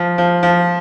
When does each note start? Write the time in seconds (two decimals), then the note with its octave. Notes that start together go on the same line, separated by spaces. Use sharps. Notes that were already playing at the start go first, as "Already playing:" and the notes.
Already playing: F3
0.18 F3
0.43 F3